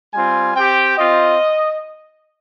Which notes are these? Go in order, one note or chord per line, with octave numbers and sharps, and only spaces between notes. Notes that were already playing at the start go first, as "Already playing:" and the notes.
G3 C4 F4 G#5
C4 G4 G5
C4 F4 D#5